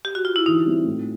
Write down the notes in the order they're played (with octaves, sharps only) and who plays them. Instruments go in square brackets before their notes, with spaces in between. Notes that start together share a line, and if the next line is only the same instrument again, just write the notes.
[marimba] G4
F#4
F4
E4
[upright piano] E3 [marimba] D#4
[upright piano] G3 C4 E4
A2